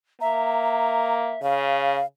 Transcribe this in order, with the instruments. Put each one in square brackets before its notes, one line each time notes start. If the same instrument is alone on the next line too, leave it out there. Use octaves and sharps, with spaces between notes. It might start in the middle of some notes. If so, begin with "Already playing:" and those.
[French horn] A#3 [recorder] E5 [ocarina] A#5
[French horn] C#3 [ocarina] F5